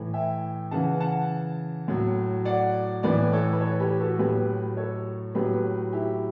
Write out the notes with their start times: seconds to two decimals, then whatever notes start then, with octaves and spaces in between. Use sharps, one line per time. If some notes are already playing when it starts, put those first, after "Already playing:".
Already playing: A2 E3
0.14 E5 G5
0.71 C#3 E3 F#5 A5
1.00 F#5 A5
1.88 A2 F#3
2.45 D5 F#5
3.03 A2 E3 B4 D5
3.32 A4 C#5
3.53 B4
3.61 A4 C#5
3.80 G4 B4
4.00 F#4 A4
4.19 A2 F#3 G4 B4
4.77 A4 C#5
5.35 A2 F#3 G4 B4
5.93 E4 G4